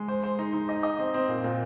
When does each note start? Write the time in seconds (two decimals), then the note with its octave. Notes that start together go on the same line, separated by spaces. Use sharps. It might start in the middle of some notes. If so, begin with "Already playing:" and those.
Already playing: G#3
0.08 C5
0.23 C5
0.39 D#4
0.53 D#4
0.69 D#5
0.83 D#5
0.99 C4
1.14 C4
1.28 A#2
1.44 A#2